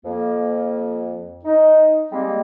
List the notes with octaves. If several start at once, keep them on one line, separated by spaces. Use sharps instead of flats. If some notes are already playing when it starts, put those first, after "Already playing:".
F2 A#3
D#4
G3 G#3 A#3 C4